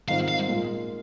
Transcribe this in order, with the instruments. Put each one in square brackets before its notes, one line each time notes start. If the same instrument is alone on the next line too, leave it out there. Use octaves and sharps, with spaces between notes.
[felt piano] G#2 D#3 C4 F4 [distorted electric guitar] F5
[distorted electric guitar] F5
[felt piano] A#2 G#3 F4 A#4